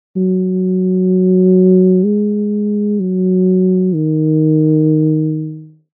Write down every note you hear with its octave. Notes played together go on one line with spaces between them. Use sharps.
F#3
G#3
F#3
D#3